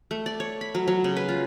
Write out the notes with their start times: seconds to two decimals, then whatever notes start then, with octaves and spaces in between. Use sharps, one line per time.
0.11 A3
0.26 D5
0.40 C#5
0.61 B5
0.75 F#3
0.88 F#3
1.04 C#3
1.16 B4
1.29 F4